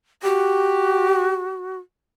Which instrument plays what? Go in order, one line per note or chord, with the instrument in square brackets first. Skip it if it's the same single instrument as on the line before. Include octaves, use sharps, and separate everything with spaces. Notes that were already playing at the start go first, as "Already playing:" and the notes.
[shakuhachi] F#4 [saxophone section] G4